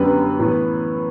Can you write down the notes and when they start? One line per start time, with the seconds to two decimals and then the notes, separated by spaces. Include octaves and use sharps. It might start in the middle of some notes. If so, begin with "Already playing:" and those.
Already playing: F#2 D3 G3 B3 B4
0.39 A2 E3 B3